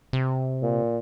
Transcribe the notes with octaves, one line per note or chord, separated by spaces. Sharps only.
C3
A#2